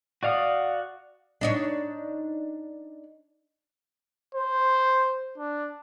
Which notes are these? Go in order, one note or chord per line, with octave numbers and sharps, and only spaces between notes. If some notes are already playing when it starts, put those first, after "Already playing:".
F#4 D5 F5 F#5 D#6
D4 D#4 C#5
C5
D4